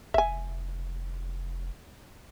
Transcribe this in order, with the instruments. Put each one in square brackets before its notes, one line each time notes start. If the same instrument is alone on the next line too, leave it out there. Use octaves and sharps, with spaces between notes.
[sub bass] F1 [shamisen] E5 G#5